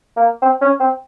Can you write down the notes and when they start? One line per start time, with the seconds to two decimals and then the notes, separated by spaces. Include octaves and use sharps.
0.17 A#3
0.42 C4
0.62 C#4
0.80 C4